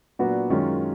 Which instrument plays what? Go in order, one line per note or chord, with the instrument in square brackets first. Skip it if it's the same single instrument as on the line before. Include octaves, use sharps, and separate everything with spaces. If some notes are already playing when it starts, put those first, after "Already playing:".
[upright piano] A#2 F#3 B3 D4 F#4
F#2 D#3 G#3 C#4 F4